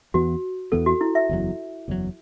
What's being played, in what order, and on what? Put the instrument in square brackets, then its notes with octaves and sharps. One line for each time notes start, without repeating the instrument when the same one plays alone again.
[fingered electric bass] E2 E3 B3 [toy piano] F#4
[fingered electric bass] E2 E3 B3 [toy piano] A4
[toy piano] F#4
E4
E5
[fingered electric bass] F#1 E2 B2 F#3
F#1 E2 B2 F#3